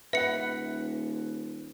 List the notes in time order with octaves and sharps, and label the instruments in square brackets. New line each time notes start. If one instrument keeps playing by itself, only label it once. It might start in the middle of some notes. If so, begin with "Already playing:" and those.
[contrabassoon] D#1 [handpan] B4 F#5 [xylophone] E5 C#7